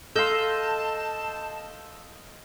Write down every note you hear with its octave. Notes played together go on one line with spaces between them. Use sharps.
A4 D#5 F5 A5 C6 E6 G6